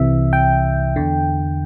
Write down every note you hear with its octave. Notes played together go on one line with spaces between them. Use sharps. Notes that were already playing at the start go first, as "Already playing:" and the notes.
Already playing: C2 C3 E3 E5
G5
E2 D3